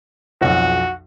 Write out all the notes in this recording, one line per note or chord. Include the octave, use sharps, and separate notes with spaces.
B1 F2 F#4